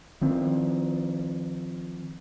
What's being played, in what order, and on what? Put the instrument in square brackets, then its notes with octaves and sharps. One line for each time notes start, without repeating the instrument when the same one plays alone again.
[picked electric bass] D#3 F3 C4